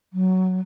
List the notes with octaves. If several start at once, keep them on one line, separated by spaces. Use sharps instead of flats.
F#3